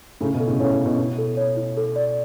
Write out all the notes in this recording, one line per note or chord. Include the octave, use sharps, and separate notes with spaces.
A2 C#3 E4
B2
A4
A2 C#3
A2 C#3 C#5
B2
E4
B2
B2 E4
A4
C#5
E4
A4
D5